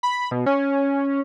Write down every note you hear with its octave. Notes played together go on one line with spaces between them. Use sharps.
B5
B2
C#4